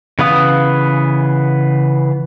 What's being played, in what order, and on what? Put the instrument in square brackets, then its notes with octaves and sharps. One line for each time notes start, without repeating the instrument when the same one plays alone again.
[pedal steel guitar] C#3 E3 B3 F5 D#6